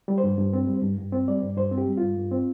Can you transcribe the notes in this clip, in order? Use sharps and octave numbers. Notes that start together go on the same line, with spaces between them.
G3
C5
G2
G2
C4
G3
G2
G2
C4
G3 D5
G2
G2 C5
C4
G4
G3
G2 F4
G2
C4